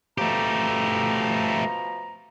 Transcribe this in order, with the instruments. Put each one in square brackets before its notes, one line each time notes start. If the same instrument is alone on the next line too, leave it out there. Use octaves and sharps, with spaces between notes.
[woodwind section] B2 F3 A#5 [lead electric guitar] A3 G4